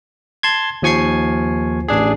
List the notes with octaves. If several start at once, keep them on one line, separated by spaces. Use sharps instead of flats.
A5 C6 G#6
D#2 F3 G#5 C#6 G#6 C7
A1 D4 G#4